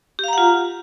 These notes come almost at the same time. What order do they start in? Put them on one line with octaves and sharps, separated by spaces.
G4 F5 A#5 F#5 F4